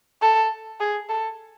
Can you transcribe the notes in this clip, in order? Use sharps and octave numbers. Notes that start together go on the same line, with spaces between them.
A4
G#4
A4